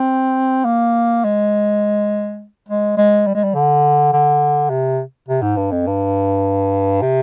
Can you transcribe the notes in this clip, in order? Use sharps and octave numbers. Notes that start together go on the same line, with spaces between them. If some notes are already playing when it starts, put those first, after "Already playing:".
Already playing: C4
A#3
G#3
G#3
G#3
G3
G#3
G3
D3
D3
C3
C3
G#2
G2
F2
G2
C3